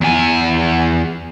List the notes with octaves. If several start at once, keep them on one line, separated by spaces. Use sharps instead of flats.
E2 G#5